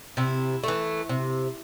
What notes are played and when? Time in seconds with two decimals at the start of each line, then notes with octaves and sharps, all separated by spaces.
0.17 C3 E4
0.64 E3 A3
1.09 C3